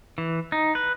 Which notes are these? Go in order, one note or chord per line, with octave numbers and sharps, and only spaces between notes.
E3
D#4
B4